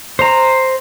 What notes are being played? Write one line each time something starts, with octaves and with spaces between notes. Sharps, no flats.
C5 A#5